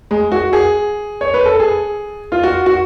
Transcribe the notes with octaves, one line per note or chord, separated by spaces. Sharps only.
G#3
F#4
G#4
C#5
B4
A4
G#4
F4
F#4
F#4